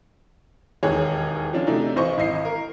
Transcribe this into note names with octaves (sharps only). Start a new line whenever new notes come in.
E1 D#2 E3 G#4 C#5
F3 C#4 D4 F4
C3 F#3 A3 D4 D#4
B1 E3 C5 D#5 C#6
G#1 E4 D#5 C7
A#4